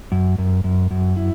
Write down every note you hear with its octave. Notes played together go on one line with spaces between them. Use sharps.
F#2
F#2
F#2
F#2
E4